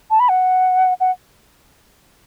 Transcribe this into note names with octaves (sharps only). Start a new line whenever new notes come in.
A5
B5
F#5
F#5